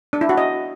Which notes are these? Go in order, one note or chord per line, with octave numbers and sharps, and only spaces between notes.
D4
E4
F#4
D#5